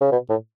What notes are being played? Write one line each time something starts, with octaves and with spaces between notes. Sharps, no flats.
C#3
B2
A2